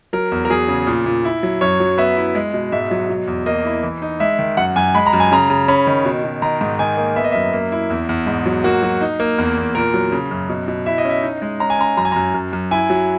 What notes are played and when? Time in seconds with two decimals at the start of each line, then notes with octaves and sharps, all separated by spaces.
0.13 F#3 A#4
0.32 E2
0.45 A#4
0.50 F#3 G#4
0.69 C#3
0.87 A#2
1.06 A#2
1.25 E4
1.43 F#3
1.61 F#2 C#5
1.80 F#3
1.98 B3 E5
2.17 E4
2.35 G#3
2.54 B2
2.72 G#2 E5
2.91 F#3
3.09 B2
3.27 E2
3.46 A#3 D#5
3.65 E4
3.83 E3
4.02 D#4
4.20 G#3 E5
4.39 D#3
4.57 F#2 F#5
4.76 F#2 G#5
4.95 G#3 B5
5.07 A#5
5.13 F#2
5.20 G#5
5.32 C#3 A#5
5.50 C#3
5.68 C#4 B5
5.87 D#3
6.05 B2
6.24 B2
6.42 D#3 A#5
6.61 G#2
6.79 D#3 G#5
6.97 A#3
7.16 B3 E5
7.24 D#5
7.32 F#2 E5
7.53 A#3
7.72 E4
7.90 E2
8.09 E2
8.27 G#2
8.46 F#3
8.64 A#3 F#4
8.83 F#3
9.01 D#4
9.20 A#3
9.38 E2
9.57 E2
9.75 A#2 A#4
9.94 F#3
10.12 C#3
10.31 F#2
10.49 B2
10.68 B2
10.86 E4 E5
10.98 D#5
11.05 C#4
11.10 E5
11.23 D#4
11.42 G#3
11.60 C#4 A#5
11.70 G#5
11.79 C#4 A#5
11.97 F#2 A#5
12.05 G#5
12.12 F#2 A#5
12.34 F#2
12.53 F#2
12.71 E4 G#5
12.90 F#3